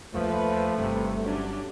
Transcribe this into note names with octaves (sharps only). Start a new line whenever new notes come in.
D#2 F3 A3 F4 B4
G1 C3
F#3 C#4 D4 G4